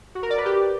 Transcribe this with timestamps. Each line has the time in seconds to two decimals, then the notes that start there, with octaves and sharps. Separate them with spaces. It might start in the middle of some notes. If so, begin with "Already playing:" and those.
0.15 F#4
0.23 A#4
0.30 D5
0.38 B4
0.45 G4